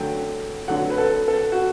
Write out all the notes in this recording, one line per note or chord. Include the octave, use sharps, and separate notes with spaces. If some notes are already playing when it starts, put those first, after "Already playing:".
Already playing: D3 F#3 A3 G5
D3 F#3 A3 F#5
B4
A4
A4
F#4